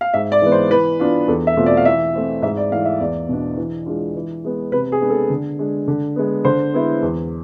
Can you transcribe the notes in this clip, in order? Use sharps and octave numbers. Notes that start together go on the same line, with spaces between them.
F5
G#2 E5
D5
E3 G#3 B3
C5
E3 B4
B3 D4 F4
E2 A4
E5
B2 A3 C4 F4
D5
F5
E3 E5
A3 C4 E4
G#2 E5
D5
E3 A3 E4 F5
E5
E2 D5
B2 B3 D4
E3
G#3 D4 F4
E3
G#3 B3
C3 B4
G#4
G#3 B3 D4
A4
D3
G#3 D4
D3
G#3 B3
D3 C5
G#3 B3 E4
E2